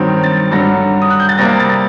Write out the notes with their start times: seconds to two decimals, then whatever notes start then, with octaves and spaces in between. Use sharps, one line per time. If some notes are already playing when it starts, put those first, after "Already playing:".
Already playing: G2 D#3 F#3 C4
0.23 A6
0.51 G2 D3 F#3 A#6
1.02 D#6
1.10 F#6
1.20 G6
1.29 A6
1.38 C3 G3 A#3 A#6
1.60 A6